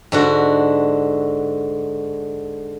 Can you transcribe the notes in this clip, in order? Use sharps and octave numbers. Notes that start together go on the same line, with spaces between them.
G#2 D3 F#4